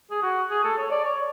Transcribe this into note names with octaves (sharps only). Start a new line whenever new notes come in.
G#4
F#4
G#4
A4
C#5
D5
C#5